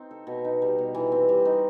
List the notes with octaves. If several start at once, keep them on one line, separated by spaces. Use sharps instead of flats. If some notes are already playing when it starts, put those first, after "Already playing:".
Already playing: C4 D#4
A4
B2
D#4
G3
B2
E3
C4
G3
D#4